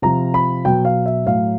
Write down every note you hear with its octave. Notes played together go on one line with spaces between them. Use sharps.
C3 F3 A#5
B5
B2 F#3 G5
F5
E5
A2 F#3 F5